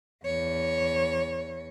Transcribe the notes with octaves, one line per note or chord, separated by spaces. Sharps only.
E2 C#5